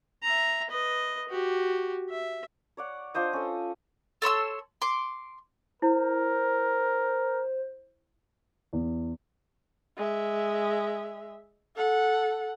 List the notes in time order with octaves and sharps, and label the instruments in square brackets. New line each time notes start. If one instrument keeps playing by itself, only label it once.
[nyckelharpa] E5 A#5
B4 D#5
F#4 G4
E5
[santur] C#5 D5 F#5
D4 F4 C5 D#5
C#4 A4
[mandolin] A4 C#5 C6 E6
C6 D6
[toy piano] E4 [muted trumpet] A#4 [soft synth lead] C5
[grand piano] E2
[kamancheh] G#3 E5
A4 F#5